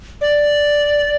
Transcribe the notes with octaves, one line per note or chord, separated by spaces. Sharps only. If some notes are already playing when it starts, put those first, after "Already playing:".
D5